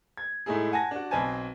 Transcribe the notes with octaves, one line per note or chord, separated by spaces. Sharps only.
G#6
A2 G#3 A3 D#4 E4 G#4
F#5 G#5 A5 A#6
D4 F#4
B1 C4 B4 G#5 A5